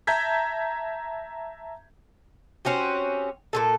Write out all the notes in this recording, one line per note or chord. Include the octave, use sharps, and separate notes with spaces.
E5 A5 A#5 G6 G#6 B6
C4 C#4 F#4 G4
A#2 C#3 A4